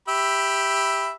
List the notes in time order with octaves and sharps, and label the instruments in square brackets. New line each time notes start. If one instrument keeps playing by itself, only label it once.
[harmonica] G4 E5 B5